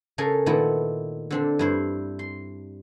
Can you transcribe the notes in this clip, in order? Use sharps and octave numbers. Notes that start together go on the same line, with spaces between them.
C#3 A4 A#4 G#5
A#2 D#3 A3 B3 E4
D3 C4 D4
G2 E4 C5
C6